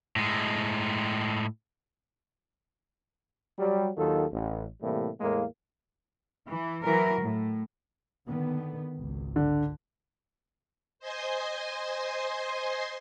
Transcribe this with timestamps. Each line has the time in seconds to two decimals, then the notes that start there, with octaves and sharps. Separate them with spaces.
0.16 A2 G#3
3.59 F#3 G3
3.97 D#2 D#3 F#3 F4 A4
4.32 A1
4.82 A2 C3 E3 G3 A#3
5.20 E2 A2 G#3 A#3
6.46 E3
6.82 E3 F#3 A#4
7.21 A2
8.26 D3 D#3 B3
8.97 G#1 C#2
9.36 D3
10.99 C5 D#5 G#5 C6